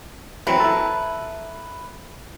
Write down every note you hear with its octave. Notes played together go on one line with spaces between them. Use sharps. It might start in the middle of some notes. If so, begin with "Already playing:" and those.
E3 F#3 C4 B4 A#5
E4 A4